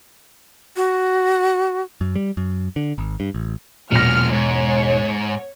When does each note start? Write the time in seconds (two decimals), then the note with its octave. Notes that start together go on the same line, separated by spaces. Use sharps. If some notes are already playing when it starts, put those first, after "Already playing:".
0.76 F#4
2.01 F#2
2.16 G3
2.37 F#2
2.76 D3
2.98 G#1
3.20 G2
3.34 A1
3.91 E1 A#2 F#3 F6 A#6
4.32 G#2 C#5